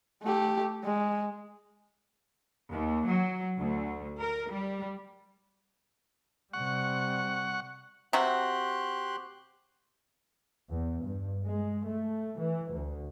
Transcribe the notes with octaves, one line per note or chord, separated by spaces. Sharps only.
A3 G4
G#3
D#2
F#3
D2
A#4
G3
C3 G3 F#5 C#6
C3 F#4 G4 C6 F#6
E2
G2
G#3
A3
E3
D2